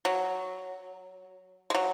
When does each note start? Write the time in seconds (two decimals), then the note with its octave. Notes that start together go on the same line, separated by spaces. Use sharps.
0.05 F#3
1.70 G#3
1.75 F#3